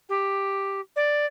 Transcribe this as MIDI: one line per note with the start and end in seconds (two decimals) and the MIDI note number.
0.09 0.80 67
0.96 1.26 74